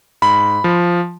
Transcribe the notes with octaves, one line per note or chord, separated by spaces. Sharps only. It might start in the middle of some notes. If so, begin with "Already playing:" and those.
G#2 B5
F3